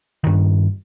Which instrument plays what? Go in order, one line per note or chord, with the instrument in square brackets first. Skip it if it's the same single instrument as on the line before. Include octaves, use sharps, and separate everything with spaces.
[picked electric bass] G2 D#3